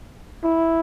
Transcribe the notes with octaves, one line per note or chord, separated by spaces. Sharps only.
E4